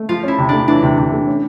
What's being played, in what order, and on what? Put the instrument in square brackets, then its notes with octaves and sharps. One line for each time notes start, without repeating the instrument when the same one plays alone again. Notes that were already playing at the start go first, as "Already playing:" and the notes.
Already playing: [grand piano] A3
[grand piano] F3 [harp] F4
[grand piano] C#4 [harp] E4
[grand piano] C3
[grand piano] A3 [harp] D4
[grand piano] E3 [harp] D4
[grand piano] C3
C3
A3
C#4